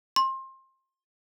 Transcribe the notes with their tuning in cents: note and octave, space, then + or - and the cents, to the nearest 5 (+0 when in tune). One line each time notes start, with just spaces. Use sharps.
C6 +25